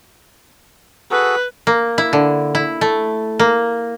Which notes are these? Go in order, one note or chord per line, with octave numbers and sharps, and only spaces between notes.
F#4 G#4 A4 B4
A#3
E4
D3
E4
A3
A#3